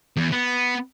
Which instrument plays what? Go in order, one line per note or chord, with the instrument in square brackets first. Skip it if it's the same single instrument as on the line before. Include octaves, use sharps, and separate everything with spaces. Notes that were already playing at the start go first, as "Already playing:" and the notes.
[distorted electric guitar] E2
B3